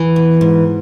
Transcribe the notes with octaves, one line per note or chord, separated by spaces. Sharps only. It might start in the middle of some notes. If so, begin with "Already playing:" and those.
Already playing: E2 E3
B2
G#2